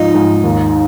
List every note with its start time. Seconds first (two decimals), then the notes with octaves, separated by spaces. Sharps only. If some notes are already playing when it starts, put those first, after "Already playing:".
Already playing: G#2 F3 D#4
0.14 G#2
0.44 D#2